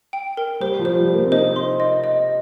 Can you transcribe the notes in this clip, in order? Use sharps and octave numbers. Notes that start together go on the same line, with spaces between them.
G5
A#4
G3 C5
F3
C5
G3
C5
A#3
C4
D#4 C5
C6
D#5
D#5